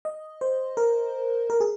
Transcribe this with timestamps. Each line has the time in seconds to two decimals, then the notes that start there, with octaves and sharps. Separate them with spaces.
0.05 D#5
0.41 C5
0.77 A#4
1.50 A#4
1.60 G#4